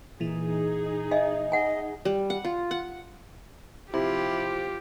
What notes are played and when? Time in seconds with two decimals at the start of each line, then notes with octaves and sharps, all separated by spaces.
0.20 A#2 E3 D#4 G#4
1.11 D#5 E5 G#5
1.52 D#5 F#5 G#5
2.05 G3
2.30 F#5
2.44 F4
2.71 F#5
3.94 C3 F3 E4 F4 G4